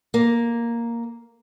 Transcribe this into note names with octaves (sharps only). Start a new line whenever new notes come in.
A#3